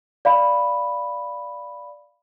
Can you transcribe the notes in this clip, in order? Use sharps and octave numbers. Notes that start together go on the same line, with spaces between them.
D5 F5 B5